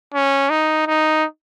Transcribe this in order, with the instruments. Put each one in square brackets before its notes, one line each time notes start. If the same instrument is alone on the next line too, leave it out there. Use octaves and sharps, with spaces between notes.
[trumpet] C#4
D#4
D#4